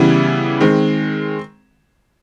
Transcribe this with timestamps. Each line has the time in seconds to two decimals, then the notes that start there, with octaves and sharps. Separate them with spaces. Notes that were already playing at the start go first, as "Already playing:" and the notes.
Already playing: C#3 E3 G3 B3 E4
0.61 D#3 G#3 C4